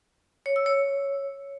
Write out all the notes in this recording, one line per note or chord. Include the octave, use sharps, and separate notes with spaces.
C#5
E6
C#5